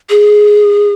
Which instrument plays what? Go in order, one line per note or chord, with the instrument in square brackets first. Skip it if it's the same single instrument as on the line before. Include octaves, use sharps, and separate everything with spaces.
[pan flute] G#4